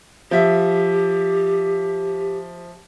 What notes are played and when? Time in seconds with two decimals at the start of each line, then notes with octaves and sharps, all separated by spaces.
0.31 F3 G4 E5